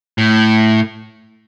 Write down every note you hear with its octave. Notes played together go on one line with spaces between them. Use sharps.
A2